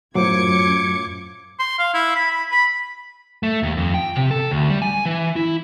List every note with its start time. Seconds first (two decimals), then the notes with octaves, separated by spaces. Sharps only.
0.15 F#2 A2 F#3 F4 C5 D6 G#6 C#7
1.59 C6
1.79 F5
1.94 E4
2.15 B5
2.32 B5
2.51 B5
3.43 A3
3.63 D#2
3.77 F2
3.94 G5
4.16 C3
4.31 A4
4.51 D2
4.70 G3
4.82 G#5
5.06 E3
5.36 E4